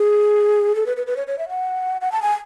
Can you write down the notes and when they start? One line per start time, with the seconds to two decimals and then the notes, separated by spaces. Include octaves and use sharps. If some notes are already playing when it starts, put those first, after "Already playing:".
Already playing: G#4
0.75 A4
0.86 B4
0.97 B4
1.07 B4
1.17 C#5
1.27 C#5
1.38 E5
1.49 F#5
2.01 F#5
2.12 A5
2.22 G#5